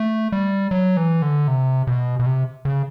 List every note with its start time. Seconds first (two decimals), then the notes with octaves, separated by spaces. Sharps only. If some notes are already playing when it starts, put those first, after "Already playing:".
Already playing: A3
0.32 G3
0.71 F#3
0.97 E3
1.22 D3
1.48 C3
1.87 B2
2.20 B2
2.26 C3
2.65 C#3